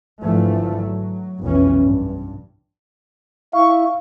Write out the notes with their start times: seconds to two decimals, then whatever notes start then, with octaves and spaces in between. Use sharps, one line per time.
0.20 G#1 D3 E3 F3 A3
0.79 F#3
1.41 F1 B1 E3 C#4
1.80 G2
3.53 E4 F5 C#6